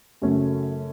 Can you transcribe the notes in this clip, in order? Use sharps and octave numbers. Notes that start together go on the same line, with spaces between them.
F#2 C#3 F#3 A3 C#4